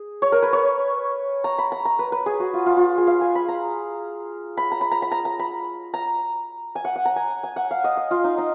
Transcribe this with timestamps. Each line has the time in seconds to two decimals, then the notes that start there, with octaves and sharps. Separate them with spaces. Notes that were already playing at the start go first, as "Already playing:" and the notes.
Already playing: G#4
0.22 C#5
0.32 A#4
0.42 B4
0.53 C#5
1.44 A#5
1.58 B5
1.72 A#5
1.85 A#5
1.99 B4
2.12 B4
2.26 G#4
2.40 F#4
2.54 F4
2.66 F4
2.77 F4
2.98 G#4
3.07 F5
3.21 G#5
3.35 B5
3.48 A#5
4.57 B5
4.72 A#5
4.81 B5
4.91 A#5
5.02 B5
5.11 A#5
5.25 A#5
5.39 B5
5.94 A#5
6.75 G#5
6.85 F#5
6.96 F#5
7.05 A#5
7.16 G#5
7.43 G#5
7.56 F#5
7.71 F5
7.84 D#5
7.97 D#5
8.11 F4
8.24 D#4
8.38 D#4